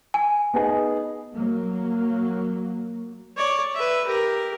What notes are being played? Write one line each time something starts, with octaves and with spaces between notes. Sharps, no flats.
G#5
B3 D#4 G#4
F#3 A#3
C#5 D5
B4 E5
G4 A#4